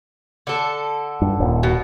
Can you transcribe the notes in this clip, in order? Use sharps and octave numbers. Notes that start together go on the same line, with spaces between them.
D3 A4
G2
D#1
B2